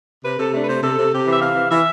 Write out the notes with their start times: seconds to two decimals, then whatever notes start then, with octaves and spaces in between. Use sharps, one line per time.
0.24 C3 B4
0.39 C3 A4
0.53 A3 D4
0.62 B4
0.68 C3 C5
0.82 C3 A4
0.97 C3
1.12 C3 G4
1.27 E3
1.32 E5
1.41 C3 F5
1.56 E3
1.70 E3 E5